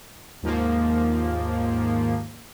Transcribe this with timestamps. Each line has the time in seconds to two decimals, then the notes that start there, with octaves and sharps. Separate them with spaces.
0.42 D#2 G#2 F3 A#3